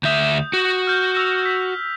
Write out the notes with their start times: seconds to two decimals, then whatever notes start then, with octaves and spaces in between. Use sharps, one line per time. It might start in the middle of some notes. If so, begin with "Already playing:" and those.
0.03 D2 E5 D#6 G6
0.53 F#4
0.87 F6 G6
1.17 E6 F7
1.42 G6 B6